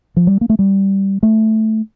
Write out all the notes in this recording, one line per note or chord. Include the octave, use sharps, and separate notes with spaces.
F3
G3
A#3
A3
G3
A3